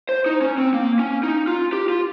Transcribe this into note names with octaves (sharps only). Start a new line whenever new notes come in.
C5
D#4
C#4
C4
A#3
C#4
D#4
F4
G4
F4